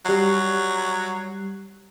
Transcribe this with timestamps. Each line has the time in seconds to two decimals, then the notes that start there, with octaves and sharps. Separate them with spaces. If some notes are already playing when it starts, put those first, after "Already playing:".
0.05 F#3 G3 C7